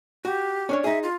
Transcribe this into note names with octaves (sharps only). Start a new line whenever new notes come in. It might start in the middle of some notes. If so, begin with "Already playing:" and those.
F#4 G4
C#4 D4 C#5
D#4 G#4 E5
F4